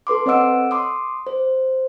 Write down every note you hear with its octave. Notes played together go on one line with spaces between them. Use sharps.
A4 B4 C6 D6
C4 C#5 D#5 F#5 E6 D7
C6 D6 D#6
C5